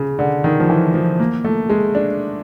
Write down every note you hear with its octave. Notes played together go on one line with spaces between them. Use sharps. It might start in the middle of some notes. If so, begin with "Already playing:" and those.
Already playing: C#3
D3
D#3
F3
E3
F3
A#3
A3
G#3
D4